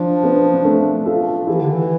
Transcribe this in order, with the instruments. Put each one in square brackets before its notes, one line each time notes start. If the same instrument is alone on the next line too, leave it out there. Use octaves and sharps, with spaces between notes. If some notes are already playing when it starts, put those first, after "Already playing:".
Already playing: [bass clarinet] F3 [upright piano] D4 F4
[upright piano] B3 D4
D4
A3 C4
F4 A4
[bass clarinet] E3 [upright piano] E4 G4
[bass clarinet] D3
E3